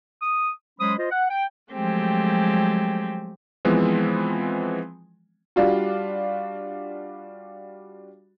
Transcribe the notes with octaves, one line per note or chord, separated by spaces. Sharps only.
D#6
F#3 G#3 C#4 C5 B5 D#6
F4 C5 D#5
F#5
G5
F3 F#3 G#3 A3 C4 G4
E3 F3 G#3 B3 C4
G3 D4 F4 F#4